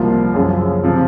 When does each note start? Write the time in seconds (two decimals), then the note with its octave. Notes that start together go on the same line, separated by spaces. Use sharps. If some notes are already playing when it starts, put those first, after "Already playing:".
Already playing: C2 A#2 F3 A#3 F4
0.34 F#2 C#3 F3 G#3
0.83 C3 F3